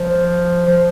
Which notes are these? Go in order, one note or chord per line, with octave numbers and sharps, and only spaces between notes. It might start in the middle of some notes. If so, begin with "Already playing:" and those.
Already playing: F3
F3